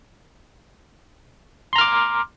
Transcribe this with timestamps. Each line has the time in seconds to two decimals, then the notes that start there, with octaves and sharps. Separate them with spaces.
1.73 C6
1.76 A#5
1.78 F6
1.81 D6